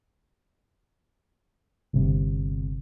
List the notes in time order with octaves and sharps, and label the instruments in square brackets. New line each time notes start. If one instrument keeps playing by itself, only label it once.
[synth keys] G1 C3